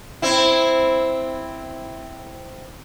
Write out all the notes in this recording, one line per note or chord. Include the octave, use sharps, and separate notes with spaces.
C4 E4